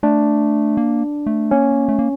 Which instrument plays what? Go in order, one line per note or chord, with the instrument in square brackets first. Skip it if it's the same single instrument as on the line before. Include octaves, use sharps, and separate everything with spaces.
[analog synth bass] A3 [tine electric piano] D4
[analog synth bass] A#3
A3
[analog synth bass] A#3 [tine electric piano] C#4
[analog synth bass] A3
A#3